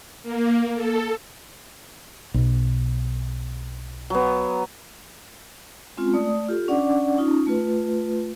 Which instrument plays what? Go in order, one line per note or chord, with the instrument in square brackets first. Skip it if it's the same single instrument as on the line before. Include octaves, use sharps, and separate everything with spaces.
[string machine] A#3
A4
[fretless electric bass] B1 B2
[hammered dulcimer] F#3 B3
[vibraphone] G#3 C4 C#4 F4
A3 D5 D#6
F4 G4 A4
C#4 D4 D5 F#5 D6
C#4 D#4 F4
A3 F4 B4